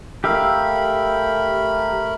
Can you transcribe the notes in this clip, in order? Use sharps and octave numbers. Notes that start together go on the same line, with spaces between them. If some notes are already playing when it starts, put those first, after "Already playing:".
A3 G4 A#4 E5 F5 B5